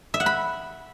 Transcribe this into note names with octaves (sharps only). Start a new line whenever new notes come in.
E5
F#5
B5